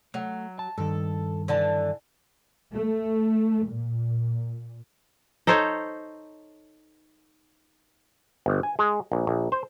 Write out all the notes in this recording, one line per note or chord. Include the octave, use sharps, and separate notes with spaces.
F#3 A3
A5
G2 D#3 A4
D3 E3 A5
A3
A#2
D#4 A4 C5 C#5
G1
G#5
G#3
A#1
A#1
C5